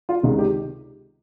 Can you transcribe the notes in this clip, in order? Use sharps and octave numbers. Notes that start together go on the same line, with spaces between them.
F4
C#2 C3 D#3
G4